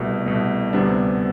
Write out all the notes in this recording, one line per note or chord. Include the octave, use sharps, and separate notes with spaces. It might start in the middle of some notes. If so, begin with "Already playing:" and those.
Already playing: C2 B2 A3
C2 B2 A3
D2 C3 G3 B3 D4